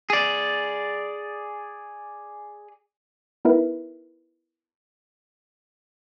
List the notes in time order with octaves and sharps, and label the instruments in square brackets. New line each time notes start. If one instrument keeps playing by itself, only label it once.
[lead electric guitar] G#4 D5
[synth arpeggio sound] B3 D#4 E4 A#4 B4 E5